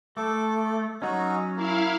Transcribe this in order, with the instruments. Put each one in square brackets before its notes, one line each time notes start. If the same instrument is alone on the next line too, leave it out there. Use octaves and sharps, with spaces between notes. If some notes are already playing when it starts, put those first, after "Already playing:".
[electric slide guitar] A3 [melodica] A4 D6
[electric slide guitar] F#3 C#4 [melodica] D#4 F#4
[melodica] A#3 [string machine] E4 F5